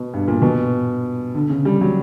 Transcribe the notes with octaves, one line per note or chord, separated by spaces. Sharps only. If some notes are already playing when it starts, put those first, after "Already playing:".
Already playing: B2
G2
A#2
B2
D3
C#3
G3
F#3